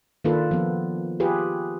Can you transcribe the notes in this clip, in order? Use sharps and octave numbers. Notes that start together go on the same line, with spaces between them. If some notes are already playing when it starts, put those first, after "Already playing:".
D#3 A#3 D4 F4 A4 B4
F3 B3
F4 G4 G#4 B4